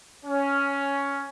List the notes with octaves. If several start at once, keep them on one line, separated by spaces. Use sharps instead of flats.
C#4